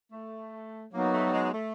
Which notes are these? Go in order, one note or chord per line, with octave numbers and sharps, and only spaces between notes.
A3
F#3 A#3 B3 D#4 F#4
A3
G3
G#3
A3